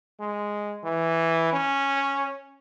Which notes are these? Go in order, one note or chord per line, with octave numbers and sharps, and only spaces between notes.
G#3
E3
C#4